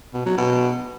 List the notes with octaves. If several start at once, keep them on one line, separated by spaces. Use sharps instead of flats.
B2
F#3
B2